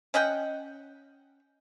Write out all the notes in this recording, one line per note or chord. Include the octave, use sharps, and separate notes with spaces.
C#4 D#5 F#5 G5